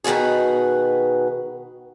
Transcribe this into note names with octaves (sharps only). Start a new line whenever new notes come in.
B2 D#3 B3 F#4 G#4